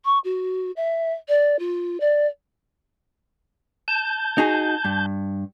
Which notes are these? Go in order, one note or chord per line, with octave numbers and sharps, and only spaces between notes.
C#6
F#4
E5
D5
F4
D5
A5 G6
D#4 F#4 G#4
G2